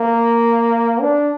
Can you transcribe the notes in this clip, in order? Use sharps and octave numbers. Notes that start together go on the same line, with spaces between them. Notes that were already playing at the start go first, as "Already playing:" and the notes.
Already playing: A#3
D4